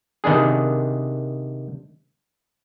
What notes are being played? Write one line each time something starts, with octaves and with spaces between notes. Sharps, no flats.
C3 D#3 B3 D4 G#4